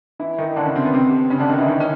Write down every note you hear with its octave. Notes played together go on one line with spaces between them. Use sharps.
E3 E4
D#3 D#4
D3 D4
C#3 C#4
C3 C4
B3
C3 C4
C#3 C#4
D3 D4
D#3 D#4
E3 E4
D#3 D#4
C#4